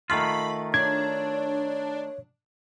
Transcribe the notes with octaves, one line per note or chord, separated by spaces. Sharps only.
D#3 A3 F4 B5
D4 C#5 G#6